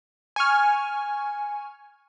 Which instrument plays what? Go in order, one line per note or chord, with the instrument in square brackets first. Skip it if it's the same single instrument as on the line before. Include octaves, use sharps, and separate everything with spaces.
[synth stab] G#5 C#6 F6